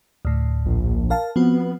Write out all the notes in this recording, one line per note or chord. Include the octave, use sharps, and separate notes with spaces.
D2 A2
A#1
A#4 F5 A5
F3 B3 C4 F#4